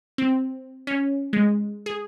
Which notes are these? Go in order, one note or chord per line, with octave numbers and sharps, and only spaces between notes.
C4
C#4
G#3
G#4